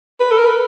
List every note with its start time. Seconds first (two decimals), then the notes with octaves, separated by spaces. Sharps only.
0.20 B4
0.31 A4
0.38 A#4
0.46 B4